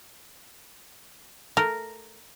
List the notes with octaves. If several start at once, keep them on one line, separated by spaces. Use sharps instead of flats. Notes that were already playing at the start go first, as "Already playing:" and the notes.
A3 A#4